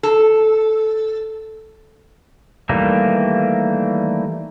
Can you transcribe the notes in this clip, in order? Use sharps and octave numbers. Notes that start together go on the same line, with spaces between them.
A4
D#3 E3 G3 A3 A#3